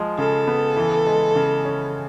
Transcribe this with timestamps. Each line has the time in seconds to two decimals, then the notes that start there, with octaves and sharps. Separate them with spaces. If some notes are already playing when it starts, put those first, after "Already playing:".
Already playing: F3 G#3
0.18 C#3 A4
0.48 B3
0.77 E3
1.06 G#3
1.35 C#3
1.65 C#4